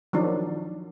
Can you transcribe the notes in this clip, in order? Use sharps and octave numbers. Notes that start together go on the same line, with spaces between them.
D#3 F3 F#3 D4